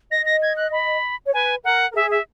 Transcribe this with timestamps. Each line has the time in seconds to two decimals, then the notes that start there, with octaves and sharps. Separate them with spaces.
0.11 D#5 A#6
0.26 A#6
0.42 G#6
0.57 F#6
0.72 B5
1.26 C#5
1.34 B4 G#5
1.64 A#4 F#5
1.91 A#4
1.95 G#4 E5
2.11 E5